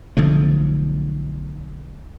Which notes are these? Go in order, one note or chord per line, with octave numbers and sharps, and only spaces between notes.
B1 D3 F3 A3